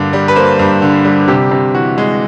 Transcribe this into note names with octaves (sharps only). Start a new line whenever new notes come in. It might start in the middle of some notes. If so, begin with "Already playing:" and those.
Already playing: G2 D3 A#3
G3
B4
A#3 C5
G2
D3
G3
C3 G4
C3
E3 F#4
G#3